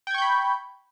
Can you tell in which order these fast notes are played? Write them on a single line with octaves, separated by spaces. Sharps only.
G5 G#6 C#6 G6 B5